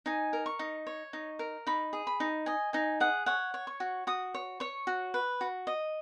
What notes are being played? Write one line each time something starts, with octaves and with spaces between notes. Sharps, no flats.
D#4 G#5
A#4
C#6
D#4
C#5
D#4
A#4
D#4 B5
G#4
B5
D#4
D#5 G#5
D#4 G#5
G#4 F#5
C#5 F#5
C#5
C#6
F#4
F#4 D#6
C#5
C#5 C#6
F#4
B4
F#4
D#5